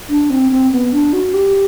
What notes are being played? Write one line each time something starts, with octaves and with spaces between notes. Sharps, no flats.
D4
C4
C4
B3
D4
F#4
G4